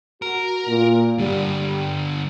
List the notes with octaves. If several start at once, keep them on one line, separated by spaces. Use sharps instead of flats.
F#4 A#4
A#2
G2 D3 G3